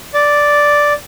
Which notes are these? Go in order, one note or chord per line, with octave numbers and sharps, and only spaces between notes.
D5